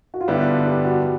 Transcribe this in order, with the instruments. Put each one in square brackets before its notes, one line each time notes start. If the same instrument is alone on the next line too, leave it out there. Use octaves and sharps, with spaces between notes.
[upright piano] F#4
F4
[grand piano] G2 D3 G3 B3 [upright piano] E4
[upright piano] F4
G4
F#4